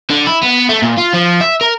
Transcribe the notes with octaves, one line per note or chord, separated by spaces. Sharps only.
D3
E4
B3
A3
A#2
F4
F3
E5
A#4